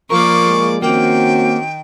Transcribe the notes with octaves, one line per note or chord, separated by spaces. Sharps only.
F3 A#3 A#4 D5 C#6
G#3 G#4
D#3 A#3 C4 C#4 F#4 G5